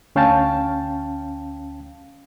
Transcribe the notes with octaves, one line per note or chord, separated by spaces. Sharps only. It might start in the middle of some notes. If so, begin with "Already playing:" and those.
D2 C#4 F5 G5 A5